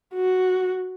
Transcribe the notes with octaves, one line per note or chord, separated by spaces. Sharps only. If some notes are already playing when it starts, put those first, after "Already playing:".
F#4